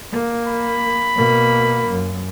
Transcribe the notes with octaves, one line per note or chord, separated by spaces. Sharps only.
A#3
B5
B2 A#3
F#2